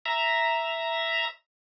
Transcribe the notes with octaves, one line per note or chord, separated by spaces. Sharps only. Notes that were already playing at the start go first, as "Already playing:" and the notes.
E5 A#5